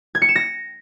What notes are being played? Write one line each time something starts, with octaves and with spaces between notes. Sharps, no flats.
G#6
C#7
E7
A#6